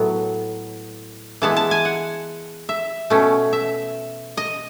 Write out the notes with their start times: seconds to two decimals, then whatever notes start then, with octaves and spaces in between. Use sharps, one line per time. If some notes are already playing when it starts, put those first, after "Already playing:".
Already playing: A2 F#3 B3
1.42 E3 G#3 B3 A5
1.57 A5
1.71 G#5
1.85 F#5
2.69 E5
3.10 B2 A3 C#4
3.53 E5
4.37 D#5